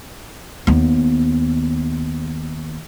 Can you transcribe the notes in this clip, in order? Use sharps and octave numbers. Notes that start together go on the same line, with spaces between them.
D#2 B3